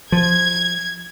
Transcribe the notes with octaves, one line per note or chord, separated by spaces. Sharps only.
F3 G#6